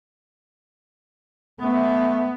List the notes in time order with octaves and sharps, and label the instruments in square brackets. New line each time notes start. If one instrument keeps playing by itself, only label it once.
[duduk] A3 [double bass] B3